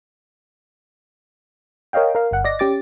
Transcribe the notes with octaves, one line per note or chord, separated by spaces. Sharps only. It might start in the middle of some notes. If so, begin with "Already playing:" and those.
A#4 C#5 D#5 F5 G5
A#4 F5
G1 F#5
D5 D#5 A#6
C#4 G4 D6 A6